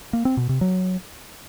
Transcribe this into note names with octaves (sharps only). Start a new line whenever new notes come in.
A#3
C4
B2
C3
F#3